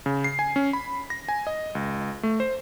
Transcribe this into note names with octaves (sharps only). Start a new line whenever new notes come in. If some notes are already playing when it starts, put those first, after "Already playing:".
C#3
C7
G#5
C#4
B5
A#6
G#5
D#5
C#2
A3
C5